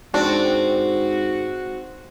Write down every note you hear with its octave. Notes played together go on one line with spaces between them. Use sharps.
G#2 C4 D4 F#4